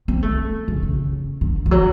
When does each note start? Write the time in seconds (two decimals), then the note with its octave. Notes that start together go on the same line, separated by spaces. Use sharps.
0.08 C4
0.23 A3
0.68 C#3
0.83 C#3
1.41 D3
1.66 F3
1.71 F#3